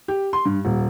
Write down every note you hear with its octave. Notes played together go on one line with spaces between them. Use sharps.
G4
C6
G2
D#1